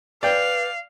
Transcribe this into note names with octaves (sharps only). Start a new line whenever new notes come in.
B4 D5 F5 G5